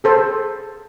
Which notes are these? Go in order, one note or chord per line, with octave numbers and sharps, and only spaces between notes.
G#4 A4 C5